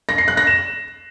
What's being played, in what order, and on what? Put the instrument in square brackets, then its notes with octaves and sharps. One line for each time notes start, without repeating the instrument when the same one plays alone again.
[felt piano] A#6
C7
F#6
A#6
E7